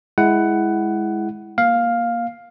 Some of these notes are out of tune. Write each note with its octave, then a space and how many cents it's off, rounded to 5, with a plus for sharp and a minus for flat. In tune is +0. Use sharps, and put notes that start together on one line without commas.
G#3 +0 E4 +0 F#5 +15
A#3 +15 F5 +5